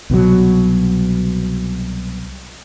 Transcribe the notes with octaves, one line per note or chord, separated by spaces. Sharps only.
C2 B2 D#3 F#3